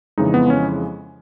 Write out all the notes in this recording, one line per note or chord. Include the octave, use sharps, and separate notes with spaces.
F2 C#3 E3 G#3 D#4
B3
C#4